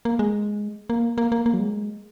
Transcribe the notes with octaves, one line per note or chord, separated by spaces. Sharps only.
A#3
G#3
A#3
A#3
A#3
A#3
F#3
G#3